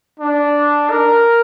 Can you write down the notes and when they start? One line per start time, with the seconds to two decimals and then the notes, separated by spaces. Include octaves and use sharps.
0.20 D4
0.91 A#4